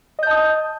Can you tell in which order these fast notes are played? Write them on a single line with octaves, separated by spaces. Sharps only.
D#5 G6 A5 D#6